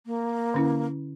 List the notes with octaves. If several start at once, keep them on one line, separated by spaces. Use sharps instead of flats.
A#3
D3 C#4 E4